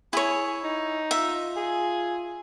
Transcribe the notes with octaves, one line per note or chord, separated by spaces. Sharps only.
E4 G#4 C#5
D#4
F4 E5
G#4